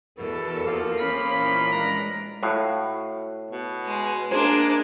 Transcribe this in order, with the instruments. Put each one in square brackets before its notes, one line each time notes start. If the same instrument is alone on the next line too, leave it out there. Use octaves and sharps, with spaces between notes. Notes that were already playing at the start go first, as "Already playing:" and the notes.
[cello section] E2 A4 [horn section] B2 [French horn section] A#4
[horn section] F3 A#3
[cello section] C#4 [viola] B5
[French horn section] A#2 E3
[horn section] G2 D4 A#5 [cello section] G#3
[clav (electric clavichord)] A2 [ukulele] F#4 F5
[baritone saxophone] B2
[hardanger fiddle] G#3
[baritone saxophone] G#3 [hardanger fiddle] A#3 D4 [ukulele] G#4 C5